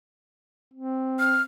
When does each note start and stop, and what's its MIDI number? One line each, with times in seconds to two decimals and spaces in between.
0.74 1.45 60
1.19 1.42 89